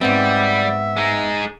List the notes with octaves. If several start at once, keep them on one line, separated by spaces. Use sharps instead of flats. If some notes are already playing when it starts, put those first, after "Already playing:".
G#2 G3 B3 C4 E5
G#3 D#4